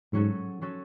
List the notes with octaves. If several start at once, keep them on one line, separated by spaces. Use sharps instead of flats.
G#2 F#3 C#4 F#4 A4
F#3 C#4 F#4 A4